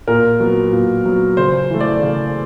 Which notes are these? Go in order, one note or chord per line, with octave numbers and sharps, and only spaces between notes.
A#2 A#4
F#3 B3
A#2
F#3 B3
C#3 C5
E3 A3
D5
C#3